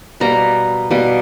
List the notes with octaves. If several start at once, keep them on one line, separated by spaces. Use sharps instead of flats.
B2 G3 A#3 A#5
B2 G3 A#3